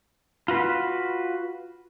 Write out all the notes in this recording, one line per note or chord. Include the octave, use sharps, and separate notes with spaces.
F4 F#4 B4